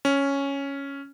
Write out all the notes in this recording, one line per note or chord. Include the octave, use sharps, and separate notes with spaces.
C#4